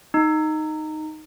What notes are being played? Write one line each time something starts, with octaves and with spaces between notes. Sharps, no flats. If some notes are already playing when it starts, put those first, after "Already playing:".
D#4